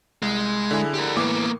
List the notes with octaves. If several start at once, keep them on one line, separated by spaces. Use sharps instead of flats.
C2 G#3
D3 E4 G#4
G4 A#4
A2 E3 A#3 B3 D6